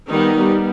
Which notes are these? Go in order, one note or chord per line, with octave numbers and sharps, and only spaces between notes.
D#3 G3 B3 D#4
G3 B3